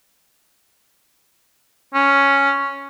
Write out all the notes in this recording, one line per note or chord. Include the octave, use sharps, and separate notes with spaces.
C#4